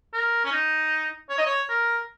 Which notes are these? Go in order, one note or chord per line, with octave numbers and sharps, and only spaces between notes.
A#4
C#4
D#4
C#5
D#5
C#5
A#4